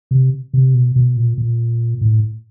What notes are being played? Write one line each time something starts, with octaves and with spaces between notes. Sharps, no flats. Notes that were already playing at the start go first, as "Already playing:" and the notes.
C3
C3
B2
B2
A#2
A#2
A2